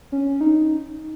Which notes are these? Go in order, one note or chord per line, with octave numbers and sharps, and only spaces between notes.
C#4
D#4